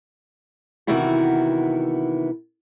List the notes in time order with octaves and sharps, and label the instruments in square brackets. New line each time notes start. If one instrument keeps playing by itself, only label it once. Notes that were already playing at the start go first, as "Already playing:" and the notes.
[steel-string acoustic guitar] C3 D#3 E3 B3 E4 F#4